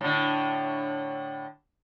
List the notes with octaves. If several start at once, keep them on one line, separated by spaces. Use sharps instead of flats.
A2 D3